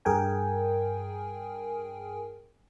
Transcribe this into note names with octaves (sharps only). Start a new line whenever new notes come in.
G2 G#4 A#4 G5 G#5